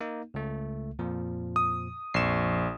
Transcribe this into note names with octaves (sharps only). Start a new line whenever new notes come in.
A#3 D#4
C#2 A3
F2 A#2 F3
D#6
A#1 F2 C#6 C7 E7